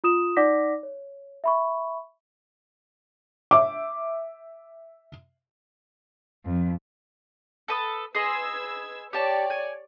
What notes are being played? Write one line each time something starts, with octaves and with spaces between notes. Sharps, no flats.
F4 D#6 E7
D#4 D5 F#5 D6 A#6 B6
C#5
E5 B5 C#6
E5 D6
F2
A4 B4 D#6
G#4 B4 D#5 C6 E6 G#6
G4 C#5 D5 A5
G#5